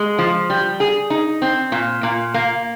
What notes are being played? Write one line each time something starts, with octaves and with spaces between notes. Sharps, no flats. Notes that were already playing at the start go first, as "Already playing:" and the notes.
Already playing: G#3
F3
G3
G#4
D#4
C4
A#2
A#2
A#3